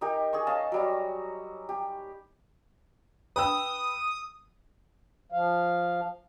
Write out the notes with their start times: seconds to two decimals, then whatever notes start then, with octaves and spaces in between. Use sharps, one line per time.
0.01 D#4 G4 A#4
0.33 G#4 G#5 C#6
0.47 C#4 D#5 F5 A5
0.72 F#3 G3 A#5
1.69 G4
3.36 B4 G5 D#6 E6
5.32 F3 F5